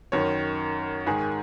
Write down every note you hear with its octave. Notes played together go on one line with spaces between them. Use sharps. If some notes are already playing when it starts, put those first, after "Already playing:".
F#2 D#3 C#5
G#2 D#3 G#4